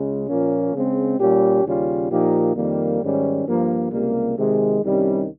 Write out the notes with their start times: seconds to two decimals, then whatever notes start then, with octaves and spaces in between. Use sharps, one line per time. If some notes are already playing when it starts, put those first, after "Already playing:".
Already playing: C#2 C#3 G#3
0.28 A#2 F3 A#3 C#4
0.74 C#3 G#3 C4
1.19 A#2 G3 C#4 G4
1.64 D#2 C#3 G3 C#4 F4
2.10 A#2 F3 A#3 D#4 G4
2.55 F2 D#3 G3 A#3
3.01 G#2 D#3 G3 C#4
3.46 G2 F3 A#3
3.91 C#2 C3 G3 A#3
4.38 C3 D#3 G#3
4.83 C2 C3 D#3 G3 C#4